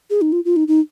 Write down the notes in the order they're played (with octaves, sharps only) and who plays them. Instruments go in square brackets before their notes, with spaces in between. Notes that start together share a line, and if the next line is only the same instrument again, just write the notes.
[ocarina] G#4
D#4
F4
F4
D#4
D#4